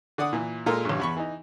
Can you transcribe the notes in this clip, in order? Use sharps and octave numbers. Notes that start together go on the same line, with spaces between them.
D3 D5 F#5 D#6
A#2 E3
A#2 G#3 F4 A4 A#4
A1 G2
E2 B5 C#6
E3 D#4